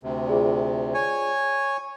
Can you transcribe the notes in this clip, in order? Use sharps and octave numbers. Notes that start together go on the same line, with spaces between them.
D2 C3
F4 G#4 D5
C#5 G#5